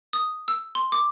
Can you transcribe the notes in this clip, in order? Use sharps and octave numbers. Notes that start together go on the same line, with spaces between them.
D#6
E6
C6
D6